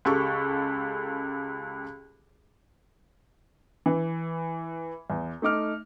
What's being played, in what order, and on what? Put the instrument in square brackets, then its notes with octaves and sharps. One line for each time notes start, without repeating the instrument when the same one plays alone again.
[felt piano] C#2 G4 A4 C#6
[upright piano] E3
E2
A3 D#4 D6 F6